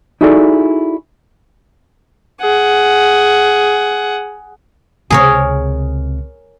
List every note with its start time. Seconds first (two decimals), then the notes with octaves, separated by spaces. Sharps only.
0.21 D#4 E4 F#4 G#4 A4 D5
2.41 G#4 F#5
5.10 C#2 C3 G#4 A#4 C#5